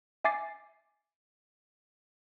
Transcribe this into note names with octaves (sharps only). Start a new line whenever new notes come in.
E5 G#5 D6 A6 C7